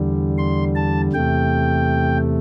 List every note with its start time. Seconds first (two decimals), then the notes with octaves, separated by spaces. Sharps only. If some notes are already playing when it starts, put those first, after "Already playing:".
Already playing: E2 D3 G3
0.38 C6
0.75 A5
1.13 E2 C3 A3 G5